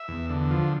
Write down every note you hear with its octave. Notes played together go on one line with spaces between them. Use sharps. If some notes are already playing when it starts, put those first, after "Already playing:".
Already playing: E5
E2
D3
F3